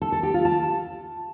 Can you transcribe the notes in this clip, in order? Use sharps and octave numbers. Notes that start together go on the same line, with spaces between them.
A4
A4
G4
F4
A5